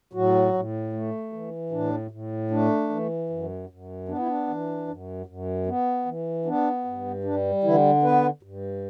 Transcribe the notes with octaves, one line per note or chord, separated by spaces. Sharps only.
A2 F#3 F#4
A2
A3
E3
A2 D4
A2
A3 D4
E3
F#2
F#2
B3 D4
E4
D4
E3
F#2
F#2
B3
E3
B3 D4
G2
G3 D4
D3 E3 E4
B3 B4
G2